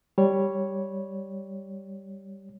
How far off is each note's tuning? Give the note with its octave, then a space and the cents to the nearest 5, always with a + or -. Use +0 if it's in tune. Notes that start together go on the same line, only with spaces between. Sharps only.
G3 +0 C#5 +0